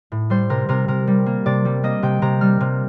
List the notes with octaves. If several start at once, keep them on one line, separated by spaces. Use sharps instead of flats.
A2
G3 C5
C3 A#4
C3 A#4
C3 A#4
G3
A#3
C3 D5
G3
A#3 D#5
C3 G5
C3 A#5
G3 F6
C3